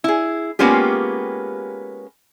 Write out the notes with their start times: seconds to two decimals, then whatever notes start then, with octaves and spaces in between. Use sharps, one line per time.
0.04 E4 G#4
0.59 G#3 A#3 B3 C#4 F4 G4